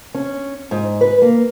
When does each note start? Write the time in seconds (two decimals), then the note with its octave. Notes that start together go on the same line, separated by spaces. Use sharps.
0.15 C#4
0.71 G#2
1.01 B4
1.22 A#3